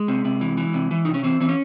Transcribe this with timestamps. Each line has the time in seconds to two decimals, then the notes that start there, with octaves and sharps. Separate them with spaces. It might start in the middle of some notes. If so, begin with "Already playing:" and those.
Already playing: G#3
0.08 C3
0.25 C3
0.41 E3
0.57 E3
0.74 C3
0.91 E3
1.05 C3 D#4
1.14 C#4
1.23 E3 C4
1.40 E3 C4
1.49 C#4